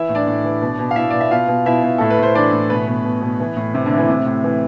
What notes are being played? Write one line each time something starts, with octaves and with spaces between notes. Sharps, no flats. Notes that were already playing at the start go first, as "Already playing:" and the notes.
Already playing: E3 E4 E5
A2
D4 D5
A2
E3
B2
B2
F5
B2 E4 E5
B2 D5
E5
B2 F4 F5
B2
B2 E4 E5
B2
A2 A4
B4
A2 C5
E3 D4 D5
A2
B2 B3 B4
B2
B2
B2
E3
A2
A2 C3 C4
D3 D4
A2
E3 E4
A2 C3 C4
A2
E3